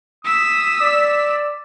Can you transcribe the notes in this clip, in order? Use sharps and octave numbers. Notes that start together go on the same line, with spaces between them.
D#6 E6 B6
D5